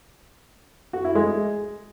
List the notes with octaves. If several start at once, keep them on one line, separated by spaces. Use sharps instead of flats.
F#4
E4
G#3